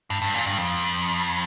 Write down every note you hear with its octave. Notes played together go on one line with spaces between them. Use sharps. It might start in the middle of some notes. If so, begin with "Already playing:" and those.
G2
G2
A#2
G2
F2